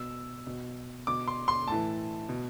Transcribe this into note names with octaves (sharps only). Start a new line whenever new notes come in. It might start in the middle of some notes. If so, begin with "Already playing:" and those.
Already playing: B2 E6
B2
B2 D6
C6
C6
A2 E3 A5
B2